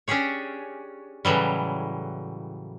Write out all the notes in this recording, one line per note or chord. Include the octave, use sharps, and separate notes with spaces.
C#4 D4 G4 G#4 C#5
A2 C#3 E3 F#3 G3